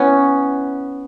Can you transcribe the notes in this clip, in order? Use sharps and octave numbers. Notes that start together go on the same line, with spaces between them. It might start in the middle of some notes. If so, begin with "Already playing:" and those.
Already playing: B3 C#4 E4